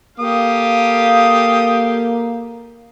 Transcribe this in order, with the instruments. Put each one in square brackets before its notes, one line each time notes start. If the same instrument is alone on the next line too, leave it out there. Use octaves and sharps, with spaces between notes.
[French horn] A#3 [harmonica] G4 D#6 [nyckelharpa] A4 F5